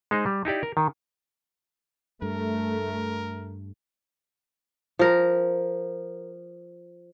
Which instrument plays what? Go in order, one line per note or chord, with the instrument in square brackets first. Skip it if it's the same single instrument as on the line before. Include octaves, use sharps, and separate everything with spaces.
[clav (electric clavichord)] G#3 D#4 C5
G3
D#4 E4 G4 D5
A#4
D#3
[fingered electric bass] G2 [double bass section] A3 [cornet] A#4
[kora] F3 A#4